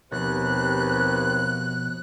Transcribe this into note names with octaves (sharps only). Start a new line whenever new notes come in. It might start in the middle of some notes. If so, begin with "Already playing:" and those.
D#2 B2 F3 B3 C4 G4 B4 F#6